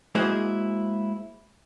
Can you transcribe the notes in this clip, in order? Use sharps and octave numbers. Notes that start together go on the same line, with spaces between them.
G#3 A#3 E4 F#4 G#4 C5